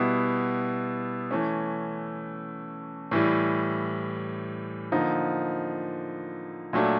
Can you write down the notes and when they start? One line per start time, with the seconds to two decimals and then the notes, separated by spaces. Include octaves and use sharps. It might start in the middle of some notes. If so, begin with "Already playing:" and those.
Already playing: B2 G3 B3 E4
1.31 E3 A3 C#4
3.11 A2 E3 G3
4.92 D3 F3 A#3 D#4
6.73 A#2 F#3 A3 D4